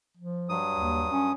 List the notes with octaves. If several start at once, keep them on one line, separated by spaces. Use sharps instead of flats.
F3
G2 F#3 D#6
D#2
C#4